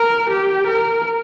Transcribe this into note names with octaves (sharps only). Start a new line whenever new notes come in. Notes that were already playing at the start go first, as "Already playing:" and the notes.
Already playing: A#4
G4
A#4